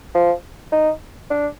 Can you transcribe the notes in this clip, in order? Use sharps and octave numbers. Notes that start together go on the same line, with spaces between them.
F3
D#4
D4